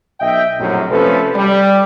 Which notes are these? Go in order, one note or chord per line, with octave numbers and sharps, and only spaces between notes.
B1 D#5 E5 G5
A#1 F#2 A2 C3 F#3
C3 F3 A3 C#4 A4 B4
G3